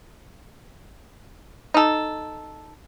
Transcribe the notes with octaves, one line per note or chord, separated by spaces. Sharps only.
D#4 A4